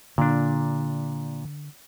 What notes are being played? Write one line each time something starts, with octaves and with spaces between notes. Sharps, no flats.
A#2 D3 D4